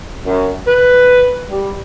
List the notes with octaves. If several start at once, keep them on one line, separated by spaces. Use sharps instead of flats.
F#2
B4
G3